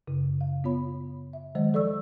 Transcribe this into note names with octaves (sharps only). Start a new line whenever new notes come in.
F#2 C#3
F5
B3 F4 C#5 B5
E5
D#3 F#3 G#3 C5 D#5
F3 A4 D5 C#6 E6